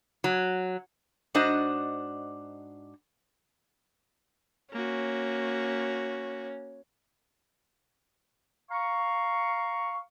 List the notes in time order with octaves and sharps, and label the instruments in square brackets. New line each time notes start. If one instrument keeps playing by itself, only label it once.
[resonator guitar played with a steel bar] F#3
G#2 D4 F#4 C5 D#5
[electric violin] A#3 F#4 [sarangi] C#4
[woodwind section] F5 A#5 C#6